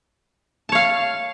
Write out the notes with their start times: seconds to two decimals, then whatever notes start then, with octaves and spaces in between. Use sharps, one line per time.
0.69 A5
0.72 C#5
0.75 F5